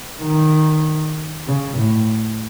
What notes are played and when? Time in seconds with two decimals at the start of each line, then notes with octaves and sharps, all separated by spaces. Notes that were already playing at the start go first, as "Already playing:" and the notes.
0.22 D#3
1.47 C#3
1.78 A2